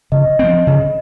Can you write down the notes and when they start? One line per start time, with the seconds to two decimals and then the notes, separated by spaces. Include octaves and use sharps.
0.12 C#3 D#5
0.39 F3 C4
0.67 C#3